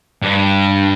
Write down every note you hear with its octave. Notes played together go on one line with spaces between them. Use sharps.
G2